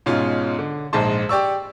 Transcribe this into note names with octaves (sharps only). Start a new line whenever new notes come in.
G#2 B2 C#4 F4
D3
A#1 G#2 G#3 C5 A5 C6
G4 D5 C#6 E6